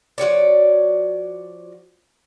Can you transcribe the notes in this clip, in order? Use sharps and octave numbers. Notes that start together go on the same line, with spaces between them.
F3 F#4 C#5 D5